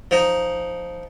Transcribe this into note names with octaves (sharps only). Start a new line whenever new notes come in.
F3 D#4